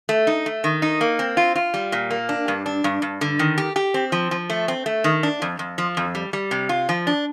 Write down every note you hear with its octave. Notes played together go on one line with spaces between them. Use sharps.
A3
D#4
A3
D#3
D#4
A#3
C4
F4
F4
G3
A#2
A#3
D4
G2
D4
G2
G2
D3
D#3
G4
G4
C4
F3
F3
A3
C4
A3
D#3
D4
F2
F2
F3
F2
G3
G3
C3
F4
F3
D4